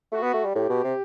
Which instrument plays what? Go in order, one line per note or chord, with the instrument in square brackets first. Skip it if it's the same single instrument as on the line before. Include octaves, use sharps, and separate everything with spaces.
[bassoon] A3 [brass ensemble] F#4
[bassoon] B3
A3
G3
[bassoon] A2 [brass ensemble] G4
[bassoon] B2
C3